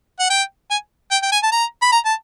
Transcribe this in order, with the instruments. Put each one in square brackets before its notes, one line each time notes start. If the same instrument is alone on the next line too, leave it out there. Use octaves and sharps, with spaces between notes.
[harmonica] F#5
G5
G#5
G5
G5
G#5
A5
A#5
B5
A#5
A5